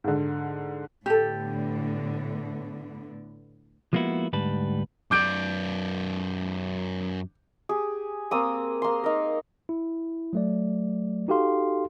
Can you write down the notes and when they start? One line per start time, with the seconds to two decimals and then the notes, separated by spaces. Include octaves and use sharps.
0.04 G#2 D3
1.06 A2 D3 B3 G4 A4
3.93 F3 G#3 A#3 B3 E4 F#4
4.33 D2 G#2 G3 B4 A5
5.11 F#2 D5 D6 G6 D7
7.69 G4 G#4
8.31 A#3 C4 D#6
8.82 A#3 C6
9.04 D#4 A#4
9.69 E4
10.33 F#3 A3 D5
11.28 D#4 F#4 G4 A4 F5 C6